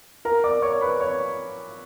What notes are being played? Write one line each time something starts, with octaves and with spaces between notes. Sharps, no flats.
A#4 A#5
D5 D6
C#5 C#6
B4 B5
C#5 C#6